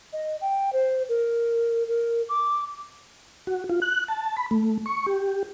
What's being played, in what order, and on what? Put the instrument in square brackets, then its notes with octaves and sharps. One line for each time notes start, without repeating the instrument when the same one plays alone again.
[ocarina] D#5
G5
C5
A#4
A#4
D6
[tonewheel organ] F#4
F4
F#6
A5
B5
A3
C#6
G4